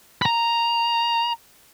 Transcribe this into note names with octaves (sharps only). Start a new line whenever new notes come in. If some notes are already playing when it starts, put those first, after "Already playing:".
A#5 B5